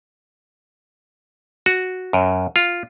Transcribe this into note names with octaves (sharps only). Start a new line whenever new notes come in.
F#4
F#2
F4